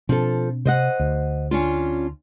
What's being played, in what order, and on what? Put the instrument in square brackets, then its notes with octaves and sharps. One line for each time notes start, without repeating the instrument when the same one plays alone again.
[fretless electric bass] B2 C4 D4 [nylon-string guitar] F3 A4
[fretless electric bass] C3 [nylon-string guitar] C5 D#5 F#5
[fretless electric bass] D2
[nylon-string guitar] C#4 D4 F4